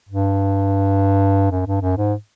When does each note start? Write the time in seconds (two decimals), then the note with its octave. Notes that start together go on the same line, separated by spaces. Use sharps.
0.09 G2
1.51 F#2
1.67 G2
1.82 F#2
1.97 G#2